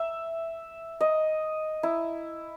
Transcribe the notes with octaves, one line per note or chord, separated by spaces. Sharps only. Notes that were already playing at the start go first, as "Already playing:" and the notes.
Already playing: E5
D#5
E4